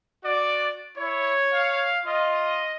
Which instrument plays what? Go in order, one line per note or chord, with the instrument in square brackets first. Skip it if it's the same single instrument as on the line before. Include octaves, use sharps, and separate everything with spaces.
[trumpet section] F#4 D5
[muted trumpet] E4 [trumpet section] C#5
[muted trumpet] F5
[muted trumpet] F4 [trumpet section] D#5